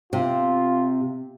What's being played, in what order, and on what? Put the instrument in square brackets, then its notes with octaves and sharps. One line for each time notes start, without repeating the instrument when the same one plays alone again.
[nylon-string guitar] C3 [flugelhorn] F4